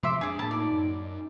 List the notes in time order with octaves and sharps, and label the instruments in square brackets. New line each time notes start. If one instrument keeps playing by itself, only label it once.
[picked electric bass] C3 F3 G#3 [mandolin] E5 C6 D6
[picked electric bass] F2 D4 [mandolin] G#4 D5
[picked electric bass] A2 A#3 [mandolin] A5 B5
[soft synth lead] D#4 [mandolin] D5
[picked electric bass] F#2
[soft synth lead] D#4